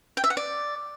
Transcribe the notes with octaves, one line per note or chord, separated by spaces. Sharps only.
G5
E5
F#5
D5